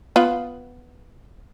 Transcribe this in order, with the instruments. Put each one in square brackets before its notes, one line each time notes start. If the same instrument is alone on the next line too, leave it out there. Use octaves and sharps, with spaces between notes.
[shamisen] B3 F4 B4